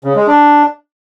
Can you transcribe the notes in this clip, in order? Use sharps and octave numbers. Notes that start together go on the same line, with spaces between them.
C#3
G#3
D4